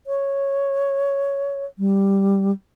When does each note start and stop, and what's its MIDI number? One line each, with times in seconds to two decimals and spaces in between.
0.07 1.66 73
1.79 2.51 55